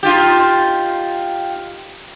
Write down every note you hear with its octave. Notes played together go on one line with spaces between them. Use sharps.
D#4 F4 G4